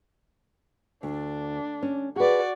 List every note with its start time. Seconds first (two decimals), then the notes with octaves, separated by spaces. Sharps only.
1.03 D2 D4
1.82 C#4
2.16 F#4 G#4 B4 D5